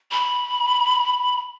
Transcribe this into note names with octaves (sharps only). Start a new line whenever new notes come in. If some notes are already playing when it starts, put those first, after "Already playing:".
B5